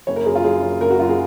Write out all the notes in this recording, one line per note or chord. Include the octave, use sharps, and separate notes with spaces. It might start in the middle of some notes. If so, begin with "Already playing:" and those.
F#1 C#5
A#4
F#2 G#4
F4
F#2 G#4
F#2
F#1 A#4
F#4
F#2 F4
G#4